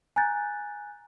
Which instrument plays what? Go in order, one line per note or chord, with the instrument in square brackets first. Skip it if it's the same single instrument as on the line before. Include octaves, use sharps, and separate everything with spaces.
[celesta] G#5 A#5 F#6 G6 A6